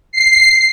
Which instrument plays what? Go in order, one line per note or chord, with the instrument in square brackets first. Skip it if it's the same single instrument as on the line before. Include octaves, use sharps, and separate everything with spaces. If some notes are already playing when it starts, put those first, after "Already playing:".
[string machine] C7